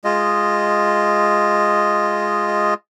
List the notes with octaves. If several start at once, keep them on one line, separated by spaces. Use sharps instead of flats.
G#3 F4 D#5